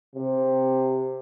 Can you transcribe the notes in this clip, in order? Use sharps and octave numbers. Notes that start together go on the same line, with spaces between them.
C3